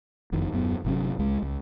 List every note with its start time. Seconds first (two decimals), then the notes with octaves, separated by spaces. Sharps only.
0.32 F#1 F2 D#3
0.53 D#1 F#2 B3
0.85 G1 C3 F#3 C#4
1.19 C#2 G#3
1.42 C#2